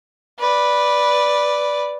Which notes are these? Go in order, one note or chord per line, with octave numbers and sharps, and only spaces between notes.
B4 D5